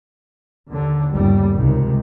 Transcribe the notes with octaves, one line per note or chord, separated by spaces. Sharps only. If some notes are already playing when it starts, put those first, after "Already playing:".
D#2 D3
G1 D#2 C#3 G3
C#2 C3 D#3